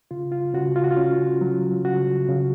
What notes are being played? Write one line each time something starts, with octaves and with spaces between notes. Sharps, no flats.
C#3 F4
F4
C#3 F#4
F4
F#4
F4
C#4
F#3
C#3 F#4
C#3